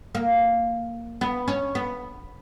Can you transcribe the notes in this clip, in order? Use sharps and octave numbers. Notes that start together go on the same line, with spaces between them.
A#3
B3
C#4
B3